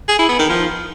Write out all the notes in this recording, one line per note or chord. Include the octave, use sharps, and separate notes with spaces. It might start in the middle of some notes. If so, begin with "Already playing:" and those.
G#4
E4
B3
D#3
F3